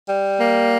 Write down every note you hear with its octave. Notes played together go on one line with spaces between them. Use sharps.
G3
A#3